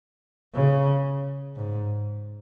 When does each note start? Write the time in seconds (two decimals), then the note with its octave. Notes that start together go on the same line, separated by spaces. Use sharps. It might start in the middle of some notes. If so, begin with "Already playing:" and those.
0.54 C#3
1.56 G#2